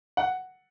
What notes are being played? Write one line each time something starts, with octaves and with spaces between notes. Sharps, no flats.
F#5